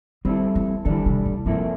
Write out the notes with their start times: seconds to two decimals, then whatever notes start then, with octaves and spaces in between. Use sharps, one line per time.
0.25 D3 G3 C4 E4 A4
0.55 E3
0.85 D3 E3 G3 D4 A4
1.06 C3
1.25 A2
1.46 G2 C3 F3 A#3 E4 A4